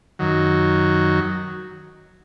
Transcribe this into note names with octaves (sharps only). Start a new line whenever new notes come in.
F#2 D#3 F#3